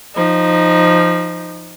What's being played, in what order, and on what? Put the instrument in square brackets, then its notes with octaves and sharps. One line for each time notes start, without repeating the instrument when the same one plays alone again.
[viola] F3 D#4